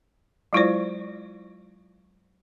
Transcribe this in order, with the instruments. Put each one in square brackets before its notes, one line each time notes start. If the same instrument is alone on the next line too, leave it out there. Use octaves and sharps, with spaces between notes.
[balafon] F#3 G#3 E4 F4 C5 D5